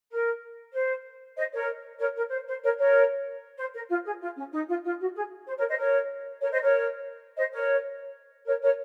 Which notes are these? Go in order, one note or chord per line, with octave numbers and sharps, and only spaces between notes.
A#4
C5
C5 D#5
A#4 C#5
A#4 C#5
A#4
C5
C5
A#4 C#5
A#4 C#5
C5
A#4
F4
G#4
F4
C#4
D#4
F4
F4
F#4
G#4
C5
A#4 C#5
C5 D#5
A#4 C#5
A#4 C#5
C5 D#5
A#4 C#5
C5 D#5
A#4 C#5
A#4 C#5
A#4 C#5